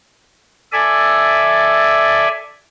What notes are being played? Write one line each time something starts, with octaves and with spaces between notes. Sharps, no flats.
A4 D5 E5 G#5